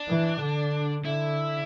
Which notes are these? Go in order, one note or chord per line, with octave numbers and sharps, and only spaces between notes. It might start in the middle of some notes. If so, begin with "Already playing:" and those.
Already playing: D4
E3
D3
D3 E4